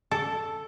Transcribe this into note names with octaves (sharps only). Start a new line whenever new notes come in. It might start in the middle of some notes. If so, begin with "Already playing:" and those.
A4